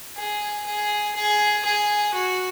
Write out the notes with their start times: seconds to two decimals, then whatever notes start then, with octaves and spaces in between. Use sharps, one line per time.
0.17 G#4
0.66 G#4
1.16 G#4
1.65 G#4
2.14 F#4